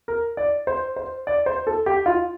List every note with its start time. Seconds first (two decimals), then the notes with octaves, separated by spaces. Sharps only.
0.08 A#4
0.37 D5
0.67 C5
0.96 C5
1.27 D5
1.46 C5
1.67 A4
1.86 G4
2.06 F4